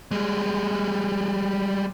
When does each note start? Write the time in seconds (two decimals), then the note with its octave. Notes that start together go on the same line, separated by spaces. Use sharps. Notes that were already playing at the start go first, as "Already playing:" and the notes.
0.11 G3 G#3